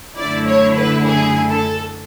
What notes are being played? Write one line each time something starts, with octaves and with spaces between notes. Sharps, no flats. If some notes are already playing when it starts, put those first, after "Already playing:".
F#2 D3 A3 E4 D5
C#5
B4
G#4
A4